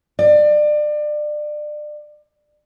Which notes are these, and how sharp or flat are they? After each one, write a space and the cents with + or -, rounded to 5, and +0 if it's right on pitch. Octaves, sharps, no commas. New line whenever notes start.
D5 +30